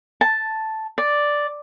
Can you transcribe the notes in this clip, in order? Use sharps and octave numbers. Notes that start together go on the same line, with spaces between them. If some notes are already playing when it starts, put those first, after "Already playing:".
A5
D5